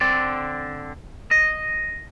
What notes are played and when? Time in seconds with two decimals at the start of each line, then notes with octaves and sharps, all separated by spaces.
0.01 D3 C4 D5
1.31 D#5